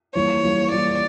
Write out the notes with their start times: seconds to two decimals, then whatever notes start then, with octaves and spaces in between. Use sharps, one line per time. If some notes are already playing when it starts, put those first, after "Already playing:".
0.15 E3 G3 A#3 C#5
0.43 E3 G3 A#3
0.71 E3 G3 A#3 D5